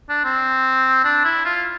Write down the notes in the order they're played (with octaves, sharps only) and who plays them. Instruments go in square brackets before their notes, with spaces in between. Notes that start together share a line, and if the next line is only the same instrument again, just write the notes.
[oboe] D4
C4
D4
E4
F4